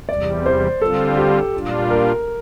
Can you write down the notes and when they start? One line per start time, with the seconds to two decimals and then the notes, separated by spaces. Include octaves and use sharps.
0.09 E2 C3 G3 D5
0.46 C5
0.81 D3 G3 C4 F4 A4
1.17 G4
1.54 A#2 G3 D4 F4
1.91 A#4